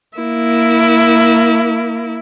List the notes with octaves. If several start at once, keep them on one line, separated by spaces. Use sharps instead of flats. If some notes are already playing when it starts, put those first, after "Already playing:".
A#3 E4